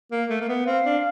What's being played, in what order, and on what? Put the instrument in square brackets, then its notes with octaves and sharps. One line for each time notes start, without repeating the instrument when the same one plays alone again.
[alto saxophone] A#3
A3
A#3
B3
[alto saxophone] C4 [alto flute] F5
[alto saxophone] D4